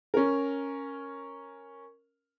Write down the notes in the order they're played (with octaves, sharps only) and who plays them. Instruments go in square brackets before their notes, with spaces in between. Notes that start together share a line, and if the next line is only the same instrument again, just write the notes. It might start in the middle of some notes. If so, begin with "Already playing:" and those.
[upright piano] C#4 A#4